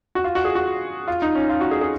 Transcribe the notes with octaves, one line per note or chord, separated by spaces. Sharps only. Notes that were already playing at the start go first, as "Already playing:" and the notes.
F#4
F4
F#4
G#4
F#4
F4
D#4
C#4
F4
F#4
G#4
G#4